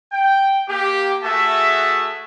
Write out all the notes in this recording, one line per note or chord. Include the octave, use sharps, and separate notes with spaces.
G5
A#3 G4
A3 F#4 G#4 E5 A5